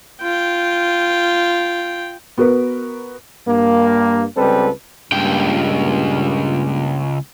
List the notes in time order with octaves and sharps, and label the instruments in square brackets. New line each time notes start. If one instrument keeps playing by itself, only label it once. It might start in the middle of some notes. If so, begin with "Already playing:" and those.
[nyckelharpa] F4 G5
[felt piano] B3 F#4 A#4 B4
[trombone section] G2 A#3
C#2 G3 C4 A4 B4
[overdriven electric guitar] C#2 G5 [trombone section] G2 A#2